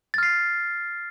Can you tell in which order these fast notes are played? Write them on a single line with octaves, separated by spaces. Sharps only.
A6 F6 C7